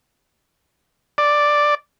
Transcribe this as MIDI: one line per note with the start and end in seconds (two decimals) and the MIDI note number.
1.18 1.75 74